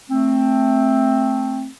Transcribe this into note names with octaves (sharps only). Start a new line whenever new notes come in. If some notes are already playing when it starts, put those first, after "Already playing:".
A3 C4